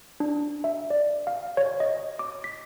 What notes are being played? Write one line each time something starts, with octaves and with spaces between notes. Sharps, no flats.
D4
E5
D5
F5
C#5
D#5
D6
B6